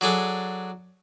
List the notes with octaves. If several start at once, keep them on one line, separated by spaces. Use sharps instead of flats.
F#3 D4 G#4 A4